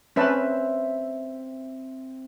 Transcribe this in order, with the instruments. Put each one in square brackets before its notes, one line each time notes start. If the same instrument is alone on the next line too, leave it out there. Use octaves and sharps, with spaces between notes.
[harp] C4 E5 [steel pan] C#4 B4 A5